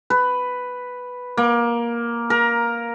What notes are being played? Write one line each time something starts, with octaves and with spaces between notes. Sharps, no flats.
B4
A#3
A#4